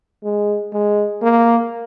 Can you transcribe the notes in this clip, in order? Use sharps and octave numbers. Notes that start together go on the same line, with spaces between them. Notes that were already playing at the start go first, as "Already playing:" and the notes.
G#3
G#3
A#3